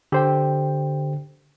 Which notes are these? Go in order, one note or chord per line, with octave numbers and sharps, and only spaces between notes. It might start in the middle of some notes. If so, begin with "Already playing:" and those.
D3 G4 C5 G5